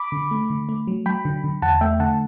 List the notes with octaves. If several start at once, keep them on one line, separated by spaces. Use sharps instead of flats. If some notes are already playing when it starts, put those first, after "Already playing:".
Already playing: B5 D6
D3
A3
D3
A3
F#3
F#3 G5 B5
D3
D3
E2 F#5 A5
A3 E5 G5
D3 F#5 A5